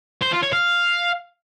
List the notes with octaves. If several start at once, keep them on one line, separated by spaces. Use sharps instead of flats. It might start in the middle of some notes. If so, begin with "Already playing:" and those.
C5
F4
C#5
F5